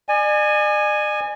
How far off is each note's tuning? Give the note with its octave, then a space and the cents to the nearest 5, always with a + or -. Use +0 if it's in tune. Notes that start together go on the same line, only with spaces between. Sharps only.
D5 +45 G#5 +0